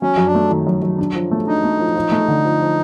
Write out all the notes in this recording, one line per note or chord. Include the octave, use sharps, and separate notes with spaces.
F#3 C#4
F#2
D4
A3
D#3
F#2
F#2
D4
F3
A3
D4 D#4
A3
F3
F3
A3
D3
F3
F3